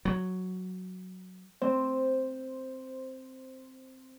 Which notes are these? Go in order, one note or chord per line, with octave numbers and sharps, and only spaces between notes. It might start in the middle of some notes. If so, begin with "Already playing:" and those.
F#3
C4 C5